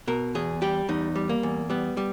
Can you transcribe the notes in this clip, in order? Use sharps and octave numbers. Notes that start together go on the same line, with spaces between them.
B2 A#4
E2 G#4
G3 G4
E2 D#4
G3
A#3
E2
G3 B3
G3